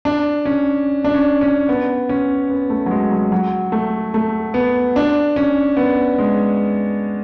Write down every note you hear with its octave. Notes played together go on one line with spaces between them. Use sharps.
D4
C#4
D4
C#4
C#4
B3
C#4
B3
A3
F#3
G#3
F#3
F#3
A3
A3
B3
D4
C#4
B3
G#3